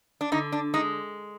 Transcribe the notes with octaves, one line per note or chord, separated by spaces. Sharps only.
D4
D3 D#4
D4
G#3 D#4